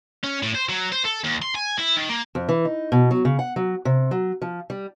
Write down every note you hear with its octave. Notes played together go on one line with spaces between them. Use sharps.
C#4
A2
C5
F#3
C5
A4
D#2
C6
G#5
E4
D#3
A#3
F2
E3
D#4
B2
F#3
C#3
F#5
F#3
C3
F#3
F3
G3